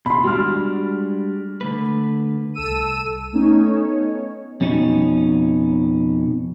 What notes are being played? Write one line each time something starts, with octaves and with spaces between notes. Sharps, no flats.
D#2 B2 B5 C6
G3 G#3 D4 F#4 F6
D3 A3 B4
C2 A4 E6 D#7
A3 B3 C#4 D#4 C#5
F2 B2 C#4 D#4